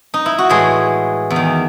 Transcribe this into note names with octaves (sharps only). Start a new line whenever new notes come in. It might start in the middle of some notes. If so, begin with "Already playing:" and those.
D#4
E4
F#4
A2 E3 G#3 G#4
E2
D#3